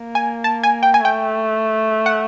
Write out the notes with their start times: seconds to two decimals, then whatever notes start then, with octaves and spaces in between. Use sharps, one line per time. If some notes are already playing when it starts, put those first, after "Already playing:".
Already playing: A#3
0.15 G#5
0.44 A5
0.63 G#5
0.83 G5
0.94 G#5
1.01 A3 G5
2.06 F#5